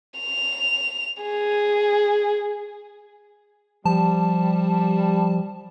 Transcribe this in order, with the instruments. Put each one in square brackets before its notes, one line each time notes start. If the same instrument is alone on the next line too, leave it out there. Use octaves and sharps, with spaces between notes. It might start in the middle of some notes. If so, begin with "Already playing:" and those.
[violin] F7
G#4
[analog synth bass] F3 [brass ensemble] G3 [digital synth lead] A5